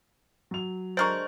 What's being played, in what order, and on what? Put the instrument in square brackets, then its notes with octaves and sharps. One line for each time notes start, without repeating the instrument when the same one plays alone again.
[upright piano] F#3 F7
[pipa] D3 G#3 A#4 [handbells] C5 [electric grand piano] C#6 F6 A6